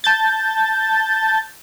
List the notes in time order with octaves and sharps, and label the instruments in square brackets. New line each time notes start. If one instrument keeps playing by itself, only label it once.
[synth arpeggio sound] A5 G6 A6